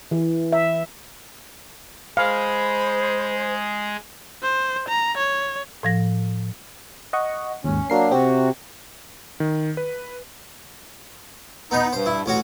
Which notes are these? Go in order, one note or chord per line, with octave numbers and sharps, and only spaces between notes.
E3
E5
G#3 G#4 C5 F5 B5
C5
A#5
C#5
A2 F3 A#6
D#5 F#5 C#6
D#2 G#2 C#4
F#3 A#3 D4 F#4 A#4 C7
C3 C4 F#4 G4
D#3
B4
B3 D#4 B4
G2 C5
E4
A1 C#4 F#4